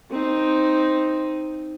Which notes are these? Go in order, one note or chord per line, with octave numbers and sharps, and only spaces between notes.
C4 D#4